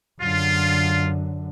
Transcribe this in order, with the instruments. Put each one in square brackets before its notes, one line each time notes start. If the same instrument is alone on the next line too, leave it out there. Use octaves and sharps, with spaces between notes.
[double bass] F#2 D3 [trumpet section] F4